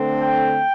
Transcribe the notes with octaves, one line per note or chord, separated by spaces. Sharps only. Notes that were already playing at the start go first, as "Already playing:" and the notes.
Already playing: D3 A3 C4
G5